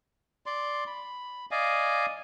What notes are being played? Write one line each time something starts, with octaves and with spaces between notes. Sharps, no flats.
D5 C6
B5
D5 D#5 F5 G#5